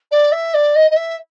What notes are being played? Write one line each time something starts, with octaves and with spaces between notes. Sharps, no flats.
D5
E5
D5
D#5
D#5
E5